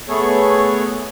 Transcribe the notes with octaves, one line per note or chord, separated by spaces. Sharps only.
A3 B3 G#4 A4 C#5